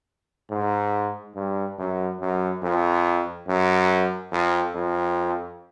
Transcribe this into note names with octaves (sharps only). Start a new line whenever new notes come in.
G#2
G2
F#2
F#2
F2
F#2
F2
F2